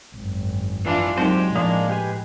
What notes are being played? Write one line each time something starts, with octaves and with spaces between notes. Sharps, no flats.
G#1 F#2
E3 D4 F4
F#3 G#3 C4 D#4 G4 A#4 C5
A2 F3 A#3 D4 E4
G4 B4 G#5